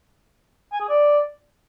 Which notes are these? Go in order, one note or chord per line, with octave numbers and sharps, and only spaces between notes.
G#5
G#4
D5